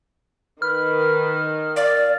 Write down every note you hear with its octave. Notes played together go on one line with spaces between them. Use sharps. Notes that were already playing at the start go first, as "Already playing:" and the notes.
D#3 B4 F6
D5 F5